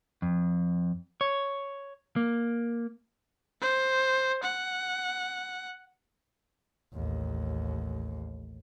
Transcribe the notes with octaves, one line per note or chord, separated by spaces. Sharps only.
F2
C#5
A#3
C5
F#5
A1 D#2